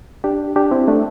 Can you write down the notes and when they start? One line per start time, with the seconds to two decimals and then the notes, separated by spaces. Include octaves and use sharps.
0.24 D4 G4
0.56 D4 G4
0.71 C4 E4
0.88 A3 D4